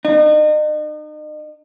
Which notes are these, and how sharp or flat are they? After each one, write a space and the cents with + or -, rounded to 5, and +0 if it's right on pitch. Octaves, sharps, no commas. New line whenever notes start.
D#4 -40